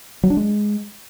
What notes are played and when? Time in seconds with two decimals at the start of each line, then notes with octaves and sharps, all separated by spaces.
0.23 F#3
0.30 D4
0.37 G#3